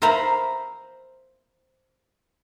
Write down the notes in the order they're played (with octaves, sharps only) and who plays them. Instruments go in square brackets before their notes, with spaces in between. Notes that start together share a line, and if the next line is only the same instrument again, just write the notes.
[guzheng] A#4 C5 E5 F5 A#5 B5